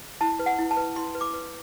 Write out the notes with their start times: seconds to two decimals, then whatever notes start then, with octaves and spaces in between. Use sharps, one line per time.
0.21 E4 A5
0.39 B4
0.46 F#5
0.58 E4
0.71 A5
0.77 B4
0.96 E4 C6
1.15 B4
1.21 D6
1.34 B4